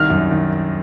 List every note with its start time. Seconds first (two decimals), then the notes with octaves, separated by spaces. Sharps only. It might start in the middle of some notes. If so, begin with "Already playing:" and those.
Already playing: C2 D#3 F6
0.10 F#2
0.31 D#3